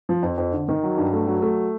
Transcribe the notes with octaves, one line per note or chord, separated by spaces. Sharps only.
F3
F2
F2
D3
D#3
F#3
G2
A3
F#3
A3